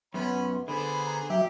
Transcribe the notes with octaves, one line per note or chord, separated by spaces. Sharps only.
F#2 B3 C#4 B5 C6
D3 B3 G#4 C5 B5
A#5
F#3 G4 E5